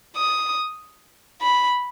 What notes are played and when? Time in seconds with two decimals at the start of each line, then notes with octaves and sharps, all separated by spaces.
0.17 D#6
1.42 B5